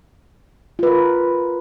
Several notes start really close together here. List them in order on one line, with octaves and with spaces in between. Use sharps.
F4 B4 A#4